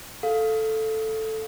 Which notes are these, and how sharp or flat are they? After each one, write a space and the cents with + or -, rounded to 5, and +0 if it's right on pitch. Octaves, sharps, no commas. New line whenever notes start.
A4 +0 F5 +0